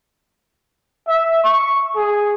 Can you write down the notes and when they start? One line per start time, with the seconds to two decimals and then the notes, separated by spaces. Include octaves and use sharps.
1.08 E5
1.44 C#6
1.96 G#4